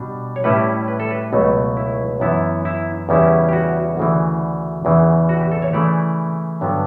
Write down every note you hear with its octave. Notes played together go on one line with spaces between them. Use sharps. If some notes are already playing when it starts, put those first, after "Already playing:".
Already playing: B2 G3 D4
C#5
A2 G3 C#4 E4 B4
B4
A4
B4
C#2 B2 F#3 A3
E4
F#2 E3 B3 E4
E4
E2 C#3 G3 C#4 E4
G4
F#4
D2 C#3 E3
E2 C#3 E3
F#4
G4
A4
C#5
C#3 E3 A3 E4 D5
G2 D3 F#3 B3